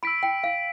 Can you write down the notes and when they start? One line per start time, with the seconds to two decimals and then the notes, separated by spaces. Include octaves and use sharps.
0.03 B5 E6 B6 D7
0.23 G5
0.44 F5